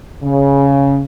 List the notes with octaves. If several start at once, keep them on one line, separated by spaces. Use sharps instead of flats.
C#3